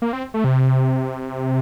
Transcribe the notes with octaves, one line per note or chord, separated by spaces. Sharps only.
A#3
C4
A3
C3